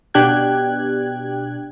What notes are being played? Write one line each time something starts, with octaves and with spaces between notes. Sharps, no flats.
B2 D4 G4 G5 F#6 G#6